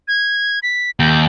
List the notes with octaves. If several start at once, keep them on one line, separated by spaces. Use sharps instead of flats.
G#6
B6
D#2 G6